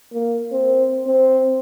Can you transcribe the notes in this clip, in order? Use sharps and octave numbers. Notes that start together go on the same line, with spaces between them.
A#3
C4
C4